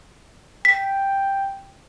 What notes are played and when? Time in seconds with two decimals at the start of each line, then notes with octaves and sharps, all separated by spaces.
0.65 G5 B6